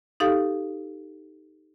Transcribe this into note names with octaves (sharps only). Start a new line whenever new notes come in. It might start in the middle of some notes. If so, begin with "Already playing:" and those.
D#4 G4 A4 F5